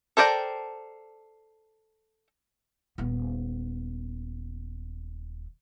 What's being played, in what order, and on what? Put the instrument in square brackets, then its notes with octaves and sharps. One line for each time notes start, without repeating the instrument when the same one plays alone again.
[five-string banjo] A4 A#4 C5 D5 G5
[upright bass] D#1 B3